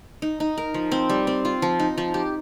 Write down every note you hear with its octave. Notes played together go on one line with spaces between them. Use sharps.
D#4
D#4
A#4
F3
C4
G3
C4
F4
F3
D#4
F3
G4